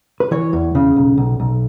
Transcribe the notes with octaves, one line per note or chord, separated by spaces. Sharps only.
B4
E3 C#5
E2
C#3
B1
B1
B1